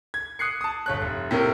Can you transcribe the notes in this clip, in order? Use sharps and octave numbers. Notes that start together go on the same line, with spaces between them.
G#6
D#6 F#6 C7 C#7
A5 D#6
G1 C#5 F#6
F1
A2 C3 A#3 A#4